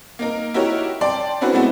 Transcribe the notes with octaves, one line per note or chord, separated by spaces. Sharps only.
A#3 D#4 A#4
D#4 E4 F#4 G4 A#4 C#5
D5 G5 A5 C6
C#4 D4 E4 F#4 B4 C5
G#3 A3 B3 E4 F#4